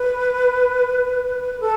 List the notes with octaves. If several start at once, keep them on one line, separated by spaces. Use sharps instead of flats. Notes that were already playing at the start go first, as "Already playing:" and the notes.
Already playing: B4
A4